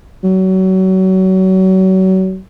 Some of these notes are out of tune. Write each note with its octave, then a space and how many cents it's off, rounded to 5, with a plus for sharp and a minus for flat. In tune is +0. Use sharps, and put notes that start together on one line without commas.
F#3 +30